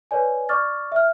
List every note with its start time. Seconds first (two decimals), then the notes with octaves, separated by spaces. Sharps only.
0.11 B4 C#5 D5 G#5
0.49 D5 C#6 D6 F6 A6
0.92 E5 F6